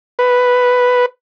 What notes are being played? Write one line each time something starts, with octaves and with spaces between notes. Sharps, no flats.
B4